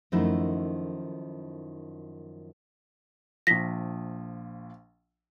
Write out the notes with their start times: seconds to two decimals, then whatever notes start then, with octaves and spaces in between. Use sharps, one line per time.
0.12 F#2 D#3 F3 A3 D#4 E4
3.47 A#1 F3 A#6 B6